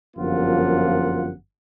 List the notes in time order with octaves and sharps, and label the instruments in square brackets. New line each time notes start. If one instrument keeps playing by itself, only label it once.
[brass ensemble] G1 F#2 F3 A#3 F4 F#5